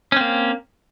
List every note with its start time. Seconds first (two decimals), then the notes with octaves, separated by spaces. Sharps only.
0.12 C#4
0.16 C4
0.21 A#3